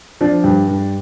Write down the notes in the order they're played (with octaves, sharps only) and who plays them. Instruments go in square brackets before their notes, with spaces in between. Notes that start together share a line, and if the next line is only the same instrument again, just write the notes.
[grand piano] F3 D4
G2
G2